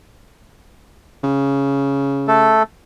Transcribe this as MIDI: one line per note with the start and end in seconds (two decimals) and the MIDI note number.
1.24 2.61 49
2.28 2.63 57
2.28 2.63 69